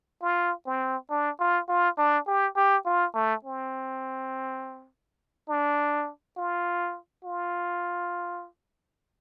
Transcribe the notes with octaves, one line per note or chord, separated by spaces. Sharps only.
F4
C4
D4
F4
F4
D4
G4
G4
F4
A3
C4
D4
F4
F4